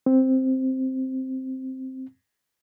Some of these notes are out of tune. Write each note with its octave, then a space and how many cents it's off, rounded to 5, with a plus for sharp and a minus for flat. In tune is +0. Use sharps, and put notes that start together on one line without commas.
C4 +0